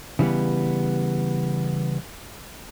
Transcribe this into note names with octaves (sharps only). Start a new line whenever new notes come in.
C#3 E3 G3 B3